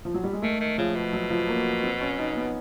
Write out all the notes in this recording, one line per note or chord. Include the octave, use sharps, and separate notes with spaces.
F3
F#3
G3
G#3
D#3 A3
D#3
C#3 F3
B2
F#3
F3
A#3
C4
C#4
D#4
B3